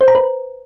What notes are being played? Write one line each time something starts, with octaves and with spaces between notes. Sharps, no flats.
C5
A#5
B4